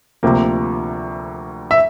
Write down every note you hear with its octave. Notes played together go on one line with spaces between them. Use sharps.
D2 C3 F3 A#3
E5